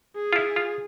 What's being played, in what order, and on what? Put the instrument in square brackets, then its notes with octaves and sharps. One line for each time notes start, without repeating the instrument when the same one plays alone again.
[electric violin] G#4
[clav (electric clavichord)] F4
E4
F4